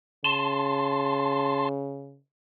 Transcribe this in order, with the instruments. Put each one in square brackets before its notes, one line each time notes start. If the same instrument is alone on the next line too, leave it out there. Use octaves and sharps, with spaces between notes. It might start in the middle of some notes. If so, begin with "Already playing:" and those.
[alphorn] C#3 [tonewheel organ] A5 C6